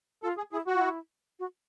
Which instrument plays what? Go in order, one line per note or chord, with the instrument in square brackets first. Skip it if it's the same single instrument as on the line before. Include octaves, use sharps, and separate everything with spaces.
[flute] F4 [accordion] A4
[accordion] G#4
[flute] E4 [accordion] G#4
[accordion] F#4
[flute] F4
E4
F#4